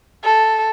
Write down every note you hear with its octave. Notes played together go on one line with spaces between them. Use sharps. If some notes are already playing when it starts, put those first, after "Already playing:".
A4